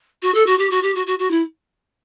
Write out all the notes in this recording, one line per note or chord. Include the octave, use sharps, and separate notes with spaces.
F#4
A4
F#4
G4
F#4
G4
F#4
F#4
F#4
E4